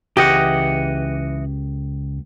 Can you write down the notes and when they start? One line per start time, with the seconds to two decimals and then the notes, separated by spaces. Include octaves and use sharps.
0.17 C#2 E3 G4 D#5 F#5